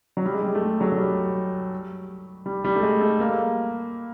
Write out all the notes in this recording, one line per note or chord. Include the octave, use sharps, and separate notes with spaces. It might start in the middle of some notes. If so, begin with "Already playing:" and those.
F#3
G3
G#3
G3
A3
G#3
F#3
F#3
G3
G3
G3
A3
G#3
A3
A#3